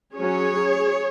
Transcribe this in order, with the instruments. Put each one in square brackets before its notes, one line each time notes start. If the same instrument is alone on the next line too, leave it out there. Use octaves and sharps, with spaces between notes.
[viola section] F#3 C#4 G#4 C#5